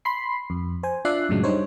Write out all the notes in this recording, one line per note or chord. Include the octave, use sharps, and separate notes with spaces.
B5 C6 C7
F2
C5 G#5
D4 F4 D5 E5 F#6 C7
F#2 A2 C#3 F#3 G#3 D4
G3 D4 D#4 C5 C#5